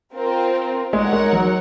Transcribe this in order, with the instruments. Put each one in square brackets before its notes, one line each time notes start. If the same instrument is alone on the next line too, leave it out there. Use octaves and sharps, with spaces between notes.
[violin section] C4 F4 A#4
[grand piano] G#3 [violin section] D#4 A#4 C#5 F#5
[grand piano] G#3
F#3